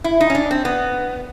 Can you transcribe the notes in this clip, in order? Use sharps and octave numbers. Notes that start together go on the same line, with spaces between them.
E4
D#4
C#4
D4
C4
B3